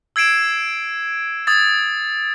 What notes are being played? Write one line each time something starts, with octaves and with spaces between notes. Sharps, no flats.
E6 G#6 C7 D7 E7
D#6 G#6 A6